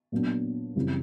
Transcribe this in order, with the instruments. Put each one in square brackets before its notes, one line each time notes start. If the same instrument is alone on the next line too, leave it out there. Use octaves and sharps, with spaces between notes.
[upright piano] A#2 F#3 B3 D4
F#2 C#3 E3 G3 C4